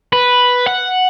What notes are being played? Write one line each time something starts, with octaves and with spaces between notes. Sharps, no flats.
B4
F#5